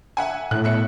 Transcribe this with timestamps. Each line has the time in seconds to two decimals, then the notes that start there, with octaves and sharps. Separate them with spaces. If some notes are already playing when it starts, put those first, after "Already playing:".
0.17 E5 F#5 G#5
0.51 A2 F#6
0.64 B2 E5 C#7